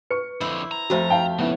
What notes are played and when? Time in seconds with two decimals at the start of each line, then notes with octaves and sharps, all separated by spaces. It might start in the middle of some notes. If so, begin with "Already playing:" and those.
0.11 B4 C#6 C#7
0.41 F2 D3 E4 C5
0.71 A#5
0.90 F2 A3 F#4 C5 E5
1.10 F5 G5 A5
1.39 C#3 B3 E4